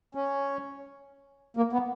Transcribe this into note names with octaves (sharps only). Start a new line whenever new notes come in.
C#4
A#3
B3